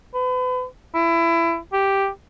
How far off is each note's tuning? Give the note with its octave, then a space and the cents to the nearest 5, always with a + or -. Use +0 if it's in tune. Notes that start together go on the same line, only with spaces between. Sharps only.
B4 +35
E4 +25
G4 +0